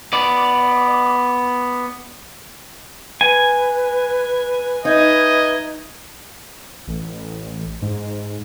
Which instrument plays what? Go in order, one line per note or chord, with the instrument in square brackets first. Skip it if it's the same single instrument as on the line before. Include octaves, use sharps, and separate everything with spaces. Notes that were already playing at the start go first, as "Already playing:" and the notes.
[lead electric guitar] B3 D5
[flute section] B4 [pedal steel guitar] G#5
[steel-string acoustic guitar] D#4 [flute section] B4 E5 G#6 [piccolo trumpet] D#5
[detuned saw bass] A1
G#2